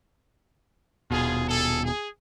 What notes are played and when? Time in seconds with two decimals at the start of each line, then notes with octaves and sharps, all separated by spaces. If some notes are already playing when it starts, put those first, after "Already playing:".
1.11 D#1 B2 F4 G#4
1.48 G#4 A4
1.82 G#4